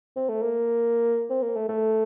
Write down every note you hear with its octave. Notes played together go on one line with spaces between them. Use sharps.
C4
A3
A#3
C4
A#3
A3
A3